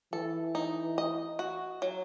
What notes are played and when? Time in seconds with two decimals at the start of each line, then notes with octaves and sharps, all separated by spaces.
0.13 E3 A4
0.55 D#4
0.98 D#5
1.39 F#4
1.82 F#3